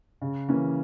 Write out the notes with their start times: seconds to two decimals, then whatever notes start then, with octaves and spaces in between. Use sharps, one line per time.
0.21 C#3
0.49 E3 A#3 C#4